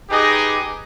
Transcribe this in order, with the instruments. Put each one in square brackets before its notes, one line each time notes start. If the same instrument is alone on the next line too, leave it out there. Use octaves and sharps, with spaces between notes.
[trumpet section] D#4 G4 G#4 B4 D#5 D6